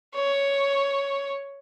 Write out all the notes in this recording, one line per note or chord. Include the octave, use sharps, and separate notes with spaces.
C#5